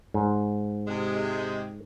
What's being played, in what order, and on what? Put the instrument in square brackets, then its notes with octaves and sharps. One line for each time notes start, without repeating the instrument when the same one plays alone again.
[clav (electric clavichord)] G#2
[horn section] C3 G#3